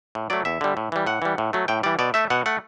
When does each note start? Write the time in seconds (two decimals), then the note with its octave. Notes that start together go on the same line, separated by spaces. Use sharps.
0.15 A2
0.30 F#3 A3 D5
0.45 E2 E5
0.61 D3 G3
0.77 A2
0.92 E3 G3
1.06 A2 F#5
1.22 E3 G3
1.38 A2
1.53 F#3 A3
1.68 A2 G5
1.83 E3 G3 D5
1.99 B2 D5
2.14 A3 E5
2.30 B2 F#5
2.46 A3 F#5